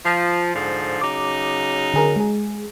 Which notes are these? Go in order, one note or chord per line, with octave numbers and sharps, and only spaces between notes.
F3
G#2 D3 F3
C#3 F#3 D#4 D6
D3 G#4 A#4
G#3 G#4